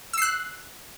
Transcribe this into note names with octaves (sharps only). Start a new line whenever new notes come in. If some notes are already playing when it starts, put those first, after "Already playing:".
E6 F#6 C7